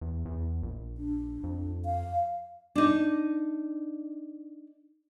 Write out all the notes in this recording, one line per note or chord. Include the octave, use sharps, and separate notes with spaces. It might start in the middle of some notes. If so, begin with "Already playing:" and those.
E2
E2
A#1
D4
F2
F5
D4 D#4